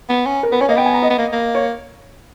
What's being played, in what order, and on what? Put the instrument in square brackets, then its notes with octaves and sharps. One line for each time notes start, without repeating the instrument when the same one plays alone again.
[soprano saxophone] B3
C#4
[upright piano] A#4
[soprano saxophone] B3 [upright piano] B4
[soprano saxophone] C#4 [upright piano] C#5
[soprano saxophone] A#3 [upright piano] D#5
[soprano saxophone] B3 [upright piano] G5
[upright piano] G#5
A#5
D#5
[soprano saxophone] B3
A#3
A#3
[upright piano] C#5